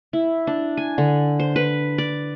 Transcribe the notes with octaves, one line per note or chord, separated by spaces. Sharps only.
E4
D4
G#5
D3
C5
B4
D5